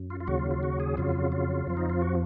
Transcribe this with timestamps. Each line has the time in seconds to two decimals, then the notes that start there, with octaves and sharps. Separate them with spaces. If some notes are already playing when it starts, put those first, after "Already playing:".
Already playing: F#2
0.10 F4
0.20 F4
0.27 D#2 C#3 F#3 F#4
0.39 F4
0.51 F4
0.63 F#4
0.80 G#4
0.97 F2 C#3 F#3 F4
1.32 F4
1.67 F2 F3
1.77 D#4
1.90 F4
2.02 F#4